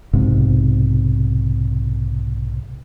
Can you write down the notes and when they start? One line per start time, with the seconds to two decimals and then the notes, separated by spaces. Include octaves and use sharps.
0.13 B1 G#2 C3